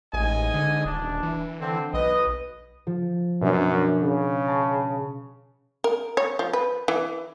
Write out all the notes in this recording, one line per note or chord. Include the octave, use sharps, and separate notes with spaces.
A1 G#2 D#5 G#5
D3
D#1 D4
E3
D3 C4
B1 B4 D#5
F3
F#2 B2 D4
C#3
A5 C#6
A#4
C#5
F3
B4
E3